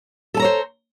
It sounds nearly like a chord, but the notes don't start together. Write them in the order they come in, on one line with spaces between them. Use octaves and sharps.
A4 A5 A#5 C#5 C5